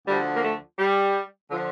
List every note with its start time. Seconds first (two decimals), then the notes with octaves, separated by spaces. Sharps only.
0.07 D2 D3 F3 G3
0.34 A#3
0.43 A3
0.78 G3
1.50 D3 F3